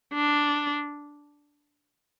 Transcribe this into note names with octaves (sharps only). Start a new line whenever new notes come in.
D4